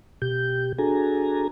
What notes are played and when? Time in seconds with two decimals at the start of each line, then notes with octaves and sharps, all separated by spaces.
0.22 B2 G4 G6
0.78 D4 F#4 G#4 A4 G#5 A#5